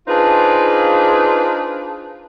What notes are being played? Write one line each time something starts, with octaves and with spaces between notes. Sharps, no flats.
D4 D#4 F4 G#4 B4 C5